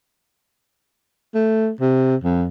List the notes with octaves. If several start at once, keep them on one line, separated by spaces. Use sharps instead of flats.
A3
C3
F2